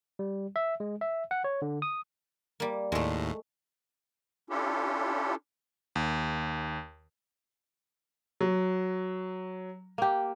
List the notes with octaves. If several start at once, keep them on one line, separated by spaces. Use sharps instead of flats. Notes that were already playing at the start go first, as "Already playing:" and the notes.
G3
E5
G#3
E5
F#5
C#5
D3
D#6
G3 A#3
D#2 A2 G#3 A3
C#4 D4 E4 F4 G4 A4
D#2
F#3
A#3 G4